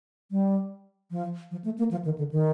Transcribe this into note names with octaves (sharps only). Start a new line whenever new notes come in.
G3
F3
F3
A3
A#3
F3
D#3
D3
D#3